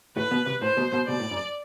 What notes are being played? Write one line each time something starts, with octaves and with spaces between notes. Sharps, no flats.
A2 A3 B4
B2 B3
C2 C3
A2 C5
B1 B2
B1 B2
B1 B2 D5
A2
F#2